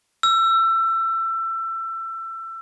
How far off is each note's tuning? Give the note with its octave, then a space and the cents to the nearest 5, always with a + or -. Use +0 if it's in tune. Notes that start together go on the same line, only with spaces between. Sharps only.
E6 +25